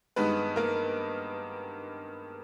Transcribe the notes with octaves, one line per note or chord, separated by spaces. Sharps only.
G2 D#3 G#3 B3 B4
A#3 A#4